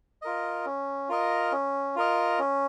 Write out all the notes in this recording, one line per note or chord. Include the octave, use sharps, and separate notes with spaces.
F4 A#4 D#5
C#4
F4 A#4 D#5
C#4
F4 A#4 D#5
C#4